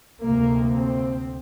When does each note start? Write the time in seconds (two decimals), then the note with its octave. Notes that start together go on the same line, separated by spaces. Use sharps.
0.22 D2 C3 A#3
0.75 C4